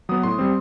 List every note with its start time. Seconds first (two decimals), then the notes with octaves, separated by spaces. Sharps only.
0.09 F#3 B3 D#6
0.23 A2 C6
0.39 G3 C4